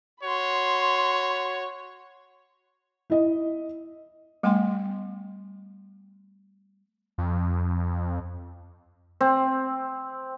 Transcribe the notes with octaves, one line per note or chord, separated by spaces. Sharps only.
F#4 C#5 B5 C6
E4 D#5
G3 A3 B3 G5 G#5 C6
F2
C4